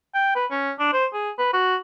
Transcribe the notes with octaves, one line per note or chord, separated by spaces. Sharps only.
G5
B4
C#4
D4
C5
G#4
B4
F#4